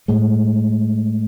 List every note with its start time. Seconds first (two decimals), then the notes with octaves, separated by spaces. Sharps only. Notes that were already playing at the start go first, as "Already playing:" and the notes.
0.08 A2 G#3